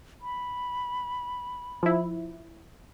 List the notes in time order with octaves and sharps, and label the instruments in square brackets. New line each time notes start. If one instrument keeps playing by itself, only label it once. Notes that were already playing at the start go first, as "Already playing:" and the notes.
[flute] B5
[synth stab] F3 E4